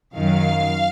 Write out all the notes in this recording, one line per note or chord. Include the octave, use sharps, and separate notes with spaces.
F#2 D#3 F#3 F5